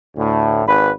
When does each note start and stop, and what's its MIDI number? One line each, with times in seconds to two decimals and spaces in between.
0.16 0.64 38
0.16 0.64 45
0.66 0.91 32
0.66 0.91 71